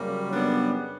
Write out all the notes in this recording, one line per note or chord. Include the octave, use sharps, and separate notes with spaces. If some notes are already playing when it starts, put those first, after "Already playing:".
Already playing: F#2 C#3 G3 A#3 C#4
B3 D4